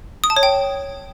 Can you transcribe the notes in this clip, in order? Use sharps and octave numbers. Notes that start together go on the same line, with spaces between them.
D#6
A5
C#5
G5